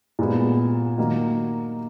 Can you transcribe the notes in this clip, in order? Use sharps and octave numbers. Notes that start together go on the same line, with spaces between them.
A#2 G#3 B3 F#4
D#3 F#3 A#3 D#4